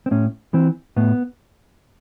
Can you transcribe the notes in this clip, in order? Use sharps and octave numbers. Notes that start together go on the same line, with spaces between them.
C4
A2 C#4
E3 C4
A2 B3